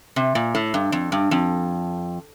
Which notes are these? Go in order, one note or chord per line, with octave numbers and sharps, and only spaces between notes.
C3
A#2
A2
G2
F2
G2
F2